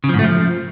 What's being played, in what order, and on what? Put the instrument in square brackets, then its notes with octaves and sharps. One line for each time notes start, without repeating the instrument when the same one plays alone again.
[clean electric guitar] C#3
F3
G#2
A3
F3